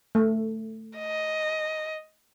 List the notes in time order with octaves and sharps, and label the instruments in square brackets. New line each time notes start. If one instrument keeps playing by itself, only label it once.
[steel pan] A3
[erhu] D#5